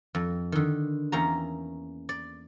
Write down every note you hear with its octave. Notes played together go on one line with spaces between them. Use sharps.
F2
D3 D#3
E2 A#3 C#4 G5 A#5
D5